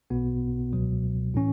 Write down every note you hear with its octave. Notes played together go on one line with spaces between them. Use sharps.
B1 B2 B3 F#4
C#2 B2 F#3
A2 E3 C#4